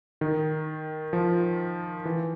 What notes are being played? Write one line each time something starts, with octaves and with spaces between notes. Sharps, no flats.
D#3
F3
E3